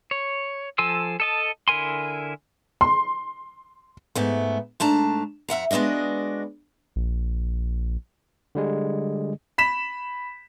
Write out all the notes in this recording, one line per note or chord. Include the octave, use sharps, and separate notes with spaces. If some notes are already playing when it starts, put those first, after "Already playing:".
C#5
F3 A4 G#5 C6 E6
A4 D#5 A5
D3 E4 A#4 G#5 C6
C6
G#2 A3 B3
G#2 A3 D4 A5 A#5
F2 E5 F#5 A#5
G#3 B3 D4 F#4 D#5
A#1
D3 G3 G#3
B5 B6 E7